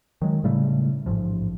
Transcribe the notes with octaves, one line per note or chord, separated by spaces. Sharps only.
D#3 F#3 G#3
A2 C#3 G3 A3
A1 G#2 B2 F3